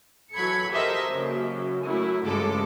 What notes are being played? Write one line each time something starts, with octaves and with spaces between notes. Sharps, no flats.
E3 F#3 A4 B5 G#6 C#7
G4 A4 A#4 C5 D#5 E5
F#2 C#3 A#3
F#2 A3 E4
A1 G2 C#3 G#3 A4 D6